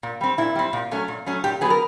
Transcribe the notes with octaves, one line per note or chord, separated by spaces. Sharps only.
A#2
G3 C4
A#2 E4
G3 C4
A#2
F#3 A3 C#4
A#2
F#3 A3 C#4
A#2 G4
F#3 B3 G#4
A#4